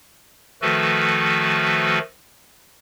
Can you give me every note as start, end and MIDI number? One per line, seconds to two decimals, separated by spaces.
0.62 1.99 51
0.62 1.99 53
0.62 1.99 57
0.62 1.99 66
0.62 1.99 69
0.62 1.99 71